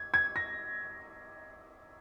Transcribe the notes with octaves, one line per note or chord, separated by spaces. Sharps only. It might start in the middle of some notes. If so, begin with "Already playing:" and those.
Already playing: G#6
G#6
A#6